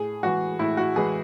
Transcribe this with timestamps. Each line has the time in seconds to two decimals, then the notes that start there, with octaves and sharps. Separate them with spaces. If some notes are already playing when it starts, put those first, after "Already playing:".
Already playing: A2 G#4
0.23 E3 G#3 F#4
0.59 A2 E4
0.77 F#4
0.96 E3 G#3 G#4